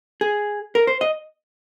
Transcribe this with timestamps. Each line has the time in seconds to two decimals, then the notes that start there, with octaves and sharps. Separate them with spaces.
0.21 G#4
0.75 A#4
0.87 C5
1.01 D#5